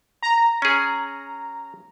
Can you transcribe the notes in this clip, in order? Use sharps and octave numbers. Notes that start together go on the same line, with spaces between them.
A#5
C#4 G#4